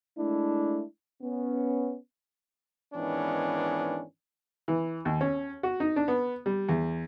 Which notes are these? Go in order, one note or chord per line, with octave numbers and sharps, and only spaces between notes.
G#3 A3 D4 E4
B3 C#4
G#2 D#3 E3 B3 C#4 D4
E3
D#2
C#4
F#4
D#4
D4
B3
G3
E2